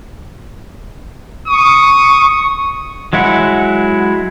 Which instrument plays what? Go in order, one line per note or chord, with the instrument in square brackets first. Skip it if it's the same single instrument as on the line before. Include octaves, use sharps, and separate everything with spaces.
[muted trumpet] C#6 [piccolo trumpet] D#6
[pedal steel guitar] F#3 G#3 E4 F#5